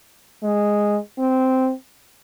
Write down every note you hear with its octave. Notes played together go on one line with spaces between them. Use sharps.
G#3
C4